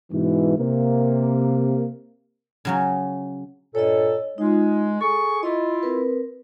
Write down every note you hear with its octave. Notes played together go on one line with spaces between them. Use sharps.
G#2 B2 E3
C3 A#3
C#3 F#3 C#4
G2 A#2 A4 C#5 D#5
G#3 D#4 F4
G#4 A4 C#6
E4 F4 D#5
C4 A#4 B4